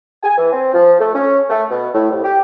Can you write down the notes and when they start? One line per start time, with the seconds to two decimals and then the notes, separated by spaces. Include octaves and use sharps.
0.23 G#5
0.37 E3
0.52 C4
0.73 F3
1.00 A3
1.14 C#4
1.49 A3
1.70 B2
1.94 A2
2.10 C2
2.24 G4